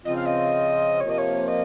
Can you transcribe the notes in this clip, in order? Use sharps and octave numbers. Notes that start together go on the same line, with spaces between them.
C#3 F3 C4 F4 D#5
F5
D#5
C3 F3 A#3 C#5
D#5
C#5
D#5